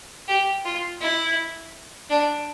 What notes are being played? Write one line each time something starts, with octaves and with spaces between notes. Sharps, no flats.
G4
F4
E4
D4